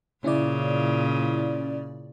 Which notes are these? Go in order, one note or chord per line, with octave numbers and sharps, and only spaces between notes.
A#2 C#3 C#4 E4 D5